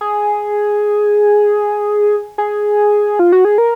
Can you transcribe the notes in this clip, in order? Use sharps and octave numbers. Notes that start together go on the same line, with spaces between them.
G#4
G#4
F4
F#4
G#4
A#4